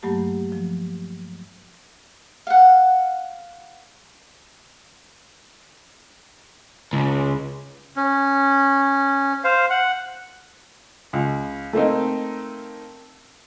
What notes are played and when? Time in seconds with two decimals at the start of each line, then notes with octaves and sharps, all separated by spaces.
0.03 G2 F#3 A3 A#3 G4 A5
0.52 F3
2.47 F5 F#5
6.93 C#2
7.96 C#4
9.44 C5 F5
9.70 F#5
11.13 C#2
11.73 A3 A#3 C4 D#4